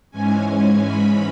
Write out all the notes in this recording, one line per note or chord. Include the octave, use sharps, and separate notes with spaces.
G#2 E3 G#3 C#4 G#5
G#5
B5